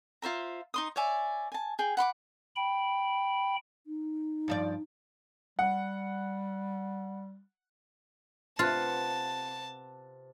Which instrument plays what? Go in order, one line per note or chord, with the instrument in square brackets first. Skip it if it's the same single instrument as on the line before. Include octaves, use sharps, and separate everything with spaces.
[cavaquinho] F4 C5 E5 A#5
D#4 C6 D#6
C#5 D5 E5 G#5
G#5 A5
G#4 G5
F#5 B5 C6 D6
[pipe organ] G5 B5
[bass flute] D#4
[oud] G2 F3 D5
[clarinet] G3 [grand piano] F#5
[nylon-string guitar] C3 B3 [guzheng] F4 [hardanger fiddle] A5 [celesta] F#6 A6